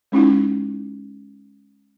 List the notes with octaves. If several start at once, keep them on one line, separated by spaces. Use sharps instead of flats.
G#3 C#4 D#4 E4